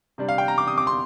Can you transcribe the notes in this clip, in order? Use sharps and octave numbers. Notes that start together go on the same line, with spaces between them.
C3 G3 D4
F5
G5
A#5
D6
D#6
D6
C6